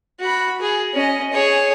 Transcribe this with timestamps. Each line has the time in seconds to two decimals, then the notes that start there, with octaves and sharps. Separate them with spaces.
0.20 F#4 B5
0.61 G#4
0.93 C#4 D#5
1.32 G#4 C#5